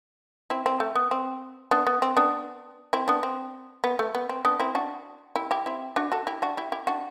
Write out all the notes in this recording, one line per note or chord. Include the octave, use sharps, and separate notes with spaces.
C4 E4
C4
A3
B3
C4
B3 D4
B3
C4
B3 D4
C4 E4
B3 D4
C4
B3
A3
B3
C4
B3 D4
C4 E4
D4 F#4
E4 G4
E4 G4
C4 E4
D4 F#4
F#4 A4
E4 G4
D4 F#4
E4 G4
E4 G4
D4 F#4